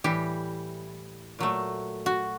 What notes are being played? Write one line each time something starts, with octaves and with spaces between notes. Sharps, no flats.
A2 E3 G3 G4
A#2 F#3 A3
F#4